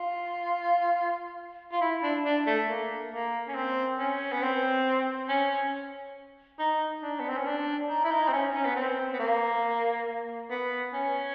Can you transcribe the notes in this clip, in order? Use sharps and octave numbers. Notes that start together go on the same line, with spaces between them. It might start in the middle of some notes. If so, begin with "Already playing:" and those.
Already playing: F4
F4
E4
D4
D4
A3
A#3
A#3
C#4
C4
C#4
B3
C4
C#4
D#4
D4
B3
C4
C#4
D4
D#4
E4
D#4
C4
C#4
C#4
B3
C4
B3
A#3
B3
C#4